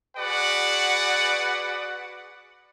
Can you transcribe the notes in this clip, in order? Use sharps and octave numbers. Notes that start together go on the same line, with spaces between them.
F#4 G#4 B4 D5 F#5